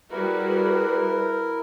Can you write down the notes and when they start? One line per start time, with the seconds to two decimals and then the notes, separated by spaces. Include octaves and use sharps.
0.11 G3 E4 F#4 G#4 A#4 B4